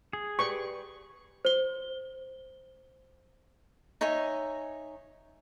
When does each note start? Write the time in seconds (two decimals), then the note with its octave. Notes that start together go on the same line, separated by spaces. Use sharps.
0.13 G#4
0.39 G4 B4 D5 C#6
1.45 C5 G7
4.01 D#4 C#5 E5 G#5